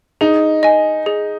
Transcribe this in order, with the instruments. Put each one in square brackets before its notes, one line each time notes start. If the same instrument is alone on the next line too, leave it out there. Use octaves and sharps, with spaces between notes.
[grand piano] D#4 [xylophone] G#4
[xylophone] D#5 G#5
G#4